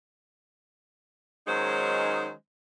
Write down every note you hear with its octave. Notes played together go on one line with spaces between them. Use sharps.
D#3 F#3 G#3 C#4 D#4 C5